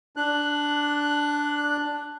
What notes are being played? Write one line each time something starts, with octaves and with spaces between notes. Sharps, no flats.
D4 F#6